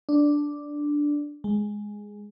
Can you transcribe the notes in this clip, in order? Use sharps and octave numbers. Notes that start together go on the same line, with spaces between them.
D4
G#3